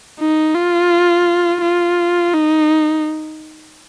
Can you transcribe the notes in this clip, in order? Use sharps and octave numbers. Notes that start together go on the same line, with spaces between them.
D#4
F4
F4
D#4